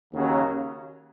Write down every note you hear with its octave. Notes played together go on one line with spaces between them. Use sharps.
D#2 C#3 F#3